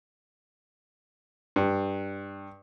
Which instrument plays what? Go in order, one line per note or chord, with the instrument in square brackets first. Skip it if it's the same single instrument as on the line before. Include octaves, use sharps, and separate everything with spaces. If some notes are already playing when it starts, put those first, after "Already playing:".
[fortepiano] G2